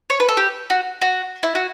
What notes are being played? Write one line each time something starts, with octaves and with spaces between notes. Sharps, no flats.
C#5
B4
A4
G4
F#4
F#4
E4
F#4